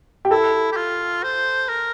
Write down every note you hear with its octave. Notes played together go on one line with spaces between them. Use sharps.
G4
E4 A4
G4
F4
C5
A#4